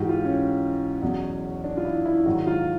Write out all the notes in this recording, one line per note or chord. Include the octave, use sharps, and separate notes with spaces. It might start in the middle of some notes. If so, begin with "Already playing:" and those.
Already playing: G#2 E3 F#4 G4
F4
C#4
E2 B2 F#3
D4
F4
E4
E4
G#2 D#3 F#3 F#4
F4